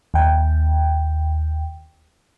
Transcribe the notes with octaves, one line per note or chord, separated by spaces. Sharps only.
D#2 G5